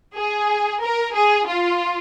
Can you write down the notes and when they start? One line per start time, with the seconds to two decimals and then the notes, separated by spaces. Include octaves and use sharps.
0.15 G#4
0.81 A#4
1.13 G#4
1.46 F4